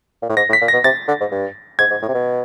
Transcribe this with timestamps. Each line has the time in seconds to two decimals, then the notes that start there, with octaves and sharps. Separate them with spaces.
0.22 A#2
0.29 A2
0.37 G#2 A#6
0.49 A2
0.53 B6
0.61 A#2
0.68 B2 A#6
0.84 C3 A6
1.08 D3
1.20 G#2
1.31 G2
1.79 G#2 G#6
1.90 G#2
2.02 A2
2.08 C3
2.14 B2